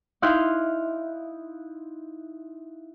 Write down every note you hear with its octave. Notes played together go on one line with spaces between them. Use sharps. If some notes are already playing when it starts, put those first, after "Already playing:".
D#4 E4 F5 C6 F#6 G6